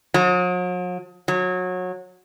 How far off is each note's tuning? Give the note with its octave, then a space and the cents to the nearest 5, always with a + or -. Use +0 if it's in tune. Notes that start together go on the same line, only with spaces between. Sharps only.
F#3 -45
F#3 -25